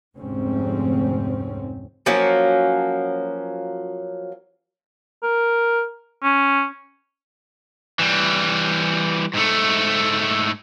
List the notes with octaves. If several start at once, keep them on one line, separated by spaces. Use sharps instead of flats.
F1 D2 G#2 C4 C#4
F3 F#3 A#3 C#4
A#4
C#4
E3 G3
G#2 A3